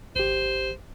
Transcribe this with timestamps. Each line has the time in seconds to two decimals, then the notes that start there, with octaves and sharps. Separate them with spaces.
0.16 G#1 G4 C5